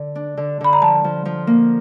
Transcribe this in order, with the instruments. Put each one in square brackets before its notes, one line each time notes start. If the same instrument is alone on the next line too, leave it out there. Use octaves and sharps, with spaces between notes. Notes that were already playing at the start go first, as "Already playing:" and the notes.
Already playing: [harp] D3
D4
D3
[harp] D3 [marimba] B5
[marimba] A#5
[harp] F3 [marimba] A5
[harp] F3
F3
A#3